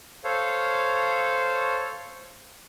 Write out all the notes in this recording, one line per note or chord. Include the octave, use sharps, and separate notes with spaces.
A4 C5 C#5 F5